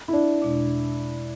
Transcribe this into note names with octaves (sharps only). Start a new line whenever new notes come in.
E4
D4
E2 B2 G#3 D4